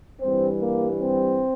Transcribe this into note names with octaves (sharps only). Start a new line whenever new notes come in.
G2 E3 G3 C4
A#3
C4